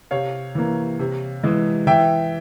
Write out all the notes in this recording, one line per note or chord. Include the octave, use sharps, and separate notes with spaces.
C3 C#5 F5
E3 A#3
C3
E3 G#3
E3 E5 G5